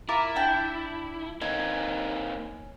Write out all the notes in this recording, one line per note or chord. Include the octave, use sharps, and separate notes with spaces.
E4 F4 A#4 D6
D4 G5 A5
A#3 C4 C#4 D#4